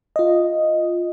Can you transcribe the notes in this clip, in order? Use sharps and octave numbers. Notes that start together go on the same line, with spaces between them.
F4 D#5